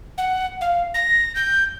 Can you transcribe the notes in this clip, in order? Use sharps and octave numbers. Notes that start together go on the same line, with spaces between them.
F#5
F5
A#6
G6